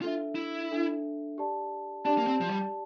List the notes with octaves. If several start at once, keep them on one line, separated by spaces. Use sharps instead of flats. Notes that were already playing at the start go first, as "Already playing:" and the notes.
D4 F4 A4 E5
E4
D4 A4 E5
G4 D5 A5
D4 G4 D5 A5
A#3
C4
F3
G3